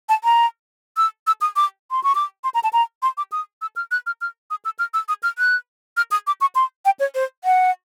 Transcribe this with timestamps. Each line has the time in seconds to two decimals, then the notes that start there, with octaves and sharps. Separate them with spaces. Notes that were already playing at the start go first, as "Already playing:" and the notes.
0.09 A5
0.24 A#5
0.97 E6
1.27 E6
1.41 D#6
1.56 D6
1.91 C6
2.04 C#6
2.15 D6
2.44 C6
2.54 A#5
2.63 A5
2.73 A#5
3.02 C6
3.17 D6
3.32 D#6
3.62 E6
3.76 F6
3.91 F#6
4.06 F6
4.21 F6
4.51 D#6
4.65 E6
4.79 F6
4.94 E6
5.08 D#6
5.23 F6
5.38 F#6
5.97 F6
6.11 D#6
6.27 D6
6.41 C#6
6.55 C6
6.85 G5
6.99 C#5
7.15 C5
7.44 F#5